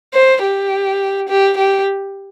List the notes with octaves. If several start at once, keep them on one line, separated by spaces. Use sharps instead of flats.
C5
G4
G4
G4